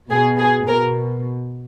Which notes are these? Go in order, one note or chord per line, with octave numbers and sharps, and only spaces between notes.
B2 G#4
G#4
B2 A#4